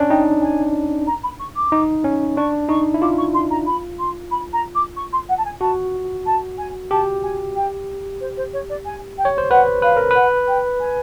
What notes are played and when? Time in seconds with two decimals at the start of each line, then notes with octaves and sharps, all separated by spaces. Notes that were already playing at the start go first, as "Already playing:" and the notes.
Already playing: C#4 D4
0.10 D#4 G5
0.42 G#5
1.07 A#5
1.23 B5
1.39 C#6
1.56 D6
1.72 D#4
2.04 C#4
2.37 D4 C#6
2.69 D#4 C#6
2.94 E4
3.02 F4 D6
3.18 C#6
3.34 C6
3.50 A#5
3.67 B5
3.99 C6
4.31 B5
4.53 A#5
4.75 D6
4.96 C#6
5.13 C6
5.29 F#5
5.38 A5
5.45 G#5
5.61 F#4 A5
6.26 A5
6.58 G#5
6.91 G4 A5
7.23 G#5
7.56 G5
8.20 C5
8.37 C5
8.53 C#5
8.69 D5
8.86 G#5
9.18 G5
9.25 C#5
9.38 C5
9.50 B4 F#5
9.82 B4 F5
9.97 A#4
10.11 B4 F#5
10.48 G5
10.80 G#5